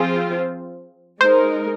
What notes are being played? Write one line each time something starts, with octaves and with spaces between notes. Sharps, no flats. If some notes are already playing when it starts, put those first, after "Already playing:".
Already playing: F3 C4 F4 G#4 C5
G#3 D#4 A#4 C5